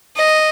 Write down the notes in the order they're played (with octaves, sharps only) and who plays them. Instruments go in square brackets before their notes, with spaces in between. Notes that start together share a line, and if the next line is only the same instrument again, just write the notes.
[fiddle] D#5